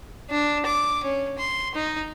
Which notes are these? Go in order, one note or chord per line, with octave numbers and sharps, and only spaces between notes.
D4
D6
C#4
C6
D#4